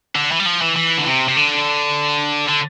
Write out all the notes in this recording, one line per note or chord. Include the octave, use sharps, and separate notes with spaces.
D3
E3
G3
F3
E3
E3
D3
C3
C3
D3
D3